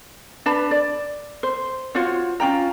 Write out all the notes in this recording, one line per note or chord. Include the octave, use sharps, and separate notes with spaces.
D4 B4 A5 B5
D5
C5
F4 F#4 C5 C#5
C#4 F4 G5 A#5